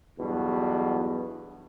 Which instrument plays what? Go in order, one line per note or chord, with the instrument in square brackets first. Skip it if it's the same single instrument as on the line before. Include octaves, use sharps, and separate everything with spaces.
[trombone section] B1 E2 G2 B2